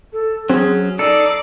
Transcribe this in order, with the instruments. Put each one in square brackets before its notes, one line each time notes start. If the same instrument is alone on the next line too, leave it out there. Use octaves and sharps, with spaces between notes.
[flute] A4
[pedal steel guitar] F#3 C#4 [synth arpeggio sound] C4 [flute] G#4
[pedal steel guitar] D#4 A4 [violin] D5 C7 [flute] E6